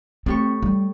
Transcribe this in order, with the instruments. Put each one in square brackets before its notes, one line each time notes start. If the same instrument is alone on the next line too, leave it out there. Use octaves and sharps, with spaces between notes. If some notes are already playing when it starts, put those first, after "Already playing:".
[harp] A2 G4 C#6 [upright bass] C4
[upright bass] G3